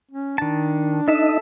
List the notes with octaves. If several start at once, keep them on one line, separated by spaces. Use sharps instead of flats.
C#4
D#3 D4 A5
D#4 A4 D#5 E5 A5